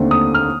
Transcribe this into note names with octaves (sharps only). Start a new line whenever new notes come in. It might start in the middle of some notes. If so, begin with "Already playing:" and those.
Already playing: D#2 D3 A3 C4
D#6
F6